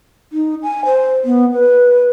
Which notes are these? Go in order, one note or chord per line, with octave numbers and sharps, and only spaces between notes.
D#4
G#5
C5
B3
B4